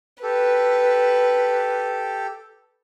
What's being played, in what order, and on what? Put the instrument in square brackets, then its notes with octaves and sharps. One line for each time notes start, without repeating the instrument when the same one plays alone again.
[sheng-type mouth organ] G4 A4 [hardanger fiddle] B4